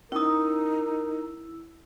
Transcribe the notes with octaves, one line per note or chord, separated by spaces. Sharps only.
C#4 D#4 E4 A#4 D#6 E6